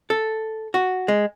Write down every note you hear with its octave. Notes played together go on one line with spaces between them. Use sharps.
A4
F#4
G#3